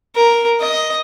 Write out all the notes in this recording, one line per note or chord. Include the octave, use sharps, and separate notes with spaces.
A#4
D#5